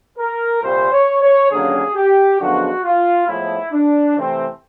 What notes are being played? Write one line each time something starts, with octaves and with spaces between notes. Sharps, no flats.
A#4
C2 A#2 G3 C4 C5
C#5
C#5
D#2 D3 F#3 A#3 C#4 G#4
G4
F#2 D3 F3 G#3 B3 F#4
F4
A2 F3 G#3 B3 E4
D4
C3 E3 A3 C4